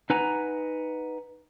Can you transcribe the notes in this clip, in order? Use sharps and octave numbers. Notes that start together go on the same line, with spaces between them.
D#4 B4 F#5 G#5 A#5